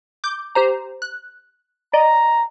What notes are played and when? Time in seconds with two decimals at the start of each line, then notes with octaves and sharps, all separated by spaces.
0.24 D6 G6
0.55 G4 C5 A#5
1.02 F#6
1.93 D5 D#5 A#5